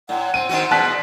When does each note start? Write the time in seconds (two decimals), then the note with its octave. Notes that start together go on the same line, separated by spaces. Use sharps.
0.09 A2 F#5
0.34 C4 D#7
0.49 D#3 C4 F#4
0.71 E2 B2 A5 F#6 B6